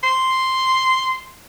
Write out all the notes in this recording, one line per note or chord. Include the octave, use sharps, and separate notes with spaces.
C6